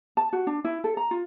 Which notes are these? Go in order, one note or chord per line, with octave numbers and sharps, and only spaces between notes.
A5
F#4
D4
E4
A4
A#5
F4